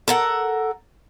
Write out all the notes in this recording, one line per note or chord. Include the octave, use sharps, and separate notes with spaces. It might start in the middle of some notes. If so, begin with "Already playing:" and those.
A4 A#4 F#5